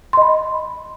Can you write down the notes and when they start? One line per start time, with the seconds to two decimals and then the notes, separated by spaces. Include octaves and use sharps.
0.13 C6
0.17 D#5
0.22 B5